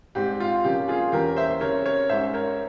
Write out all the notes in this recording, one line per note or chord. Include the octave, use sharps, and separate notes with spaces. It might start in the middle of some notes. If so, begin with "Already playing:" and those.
G#2 G3 C4 G4
F4
C3 F3 A#3 C#4 G4
F4 G#4
E2 E3 A#3 C#4 G4 A#4
C5 E5
C#3 G3 C4 A#4 C#5
A#4 C#5
G#2 G3 C#4 C5 E5
A#4 C#5